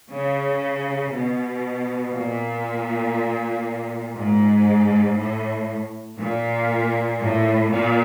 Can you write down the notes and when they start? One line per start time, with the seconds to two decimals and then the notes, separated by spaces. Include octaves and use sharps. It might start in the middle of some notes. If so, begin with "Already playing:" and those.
0.11 C#3
1.12 B2
2.13 A#2
4.16 G#2
5.17 A2
6.19 A#2
7.19 A2
7.69 A#2